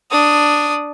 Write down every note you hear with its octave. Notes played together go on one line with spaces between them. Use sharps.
D4 D#6